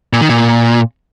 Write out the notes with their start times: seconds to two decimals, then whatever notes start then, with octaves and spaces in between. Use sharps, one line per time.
0.13 A#2
0.21 D#3
0.29 A#2